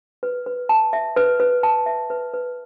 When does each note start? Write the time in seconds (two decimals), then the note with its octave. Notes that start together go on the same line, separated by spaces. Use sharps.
0.23 B4
0.46 B4
0.69 A5
0.93 E5
1.17 B4
1.40 B4
1.63 A5
1.86 E5
2.10 B4
2.34 B4